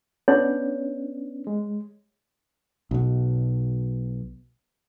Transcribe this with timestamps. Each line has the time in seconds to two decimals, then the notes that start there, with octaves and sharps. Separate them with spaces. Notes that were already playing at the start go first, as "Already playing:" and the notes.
0.28 B3 C#4 D4 C#5
1.47 G#3
2.91 B1 B2